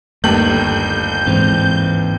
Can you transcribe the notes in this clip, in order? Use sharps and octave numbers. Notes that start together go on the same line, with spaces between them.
G1 D#2 A3 G6 F#7
G#2 E3 C4